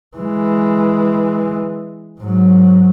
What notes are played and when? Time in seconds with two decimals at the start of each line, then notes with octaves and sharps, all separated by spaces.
0.17 E3 G#3
2.20 G#2 F#3